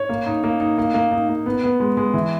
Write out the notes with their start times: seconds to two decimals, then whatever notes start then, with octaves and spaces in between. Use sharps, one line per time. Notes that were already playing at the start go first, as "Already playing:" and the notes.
Already playing: C#5
0.09 A#3
0.26 D#4
0.44 A#3
0.60 D#4
0.78 A#3
0.94 A#3
1.12 D#4
1.29 A#3
1.46 B3
1.63 B3
1.80 G#3
1.97 G#3
2.14 E3